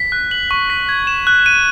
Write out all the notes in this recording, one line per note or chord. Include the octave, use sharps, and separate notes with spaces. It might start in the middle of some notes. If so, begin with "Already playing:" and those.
Already playing: B6
F#6
F#7
C#6
B6
G#6
E7
F#6
D#7